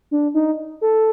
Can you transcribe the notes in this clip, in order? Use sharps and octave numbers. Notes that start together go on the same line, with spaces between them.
D4
D#4
A4